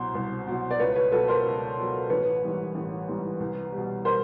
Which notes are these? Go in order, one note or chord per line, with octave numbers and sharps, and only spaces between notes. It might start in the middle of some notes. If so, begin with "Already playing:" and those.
Already playing: C2 B2 F#3 C5
C2
B2 F#3
D5
C#2 B4 C#5
B4 C#5
B2 F#3 A4 B4
A#4 C5
C#2
B2 F#3
A1 B4 C#5
G#2 E3 G3
A1
G#2 E3 G3
C2
G3
B2
A#4 C5